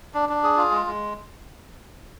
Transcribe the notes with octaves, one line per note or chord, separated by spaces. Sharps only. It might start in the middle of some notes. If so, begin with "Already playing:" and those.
D4
D4
G#4
F4
G#3
G#3